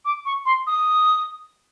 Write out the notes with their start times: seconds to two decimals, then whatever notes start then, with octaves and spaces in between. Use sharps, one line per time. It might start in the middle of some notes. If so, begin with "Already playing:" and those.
0.05 D6
0.25 C#6
0.46 C6
0.67 D#6